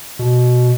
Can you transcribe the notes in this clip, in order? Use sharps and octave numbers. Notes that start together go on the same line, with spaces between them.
B2